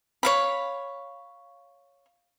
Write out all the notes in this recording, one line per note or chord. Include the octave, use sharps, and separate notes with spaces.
C#5 F5 B5